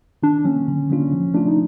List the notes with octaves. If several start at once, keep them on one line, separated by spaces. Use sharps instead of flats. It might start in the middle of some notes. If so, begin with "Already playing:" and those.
D#3 D4
F#3 A#3 C#4
D3
F#3 A#3 D4 F4
F3
A3 D4 F4
D#4